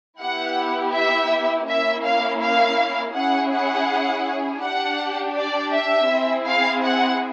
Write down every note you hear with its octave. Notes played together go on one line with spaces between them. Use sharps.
B3 E4 G4 F#5
E5
A#3 C#4 E4 E5
F5
F5
C#4 E4 G#4 F#5
F#5
D4 G4 F#5
D5
E5
C4 E4 G#4
F5
F#5